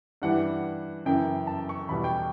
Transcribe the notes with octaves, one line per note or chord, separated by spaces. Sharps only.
G2 E3 G3 F#5
F#2 C#3 E3 G5
A5
C#6
E2 B2 G3 B5
G5